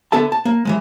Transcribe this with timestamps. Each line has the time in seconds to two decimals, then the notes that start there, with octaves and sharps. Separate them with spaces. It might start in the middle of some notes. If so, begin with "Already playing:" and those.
0.12 D3 B3 A4 E5 A5
0.32 A5
0.45 A#3
0.65 E3 F3 G#3